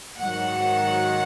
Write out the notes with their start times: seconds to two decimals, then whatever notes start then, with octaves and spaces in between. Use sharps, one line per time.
0.18 G#2 D#3 F#3 F#5